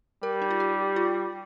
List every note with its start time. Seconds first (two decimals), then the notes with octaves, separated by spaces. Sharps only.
0.23 G3 A#4
0.42 D#4
0.51 F4
0.60 G4
0.96 F4